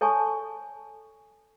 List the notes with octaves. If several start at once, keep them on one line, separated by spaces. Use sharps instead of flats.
A4 C#5 G#5 A5 C#6